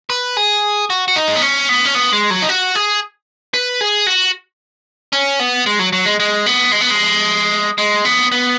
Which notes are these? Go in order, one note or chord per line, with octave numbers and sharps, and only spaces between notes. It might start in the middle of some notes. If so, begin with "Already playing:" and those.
B4
G#4
F#4
F#4
D#4
G#3
B3
C#4
B3
C#4
B3
G#3
F#3
D#4
F#4
G#4
B4
G#4
F#4
C#4
B3
G#3
F#3
F#3
G#3
G#3
B3
G#3
B3
G#3
G#3
B3
B3